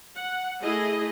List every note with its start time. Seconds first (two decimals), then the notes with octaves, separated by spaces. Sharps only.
0.15 F#5
0.60 A3 E4 G#4 D#5